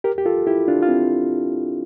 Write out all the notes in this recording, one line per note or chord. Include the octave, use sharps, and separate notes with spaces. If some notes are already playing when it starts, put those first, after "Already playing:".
G4 A#4
G4
F4 A4
E4 G4
D4 F4
F4
C4 E4